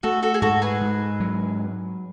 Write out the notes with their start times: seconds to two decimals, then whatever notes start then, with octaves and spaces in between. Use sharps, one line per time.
0.03 A3 F#4 A4
0.22 F#4 A4
0.34 G#4
0.42 G#2 F#4 A4
0.62 G#4 B4
0.81 G#2
1.20 F#3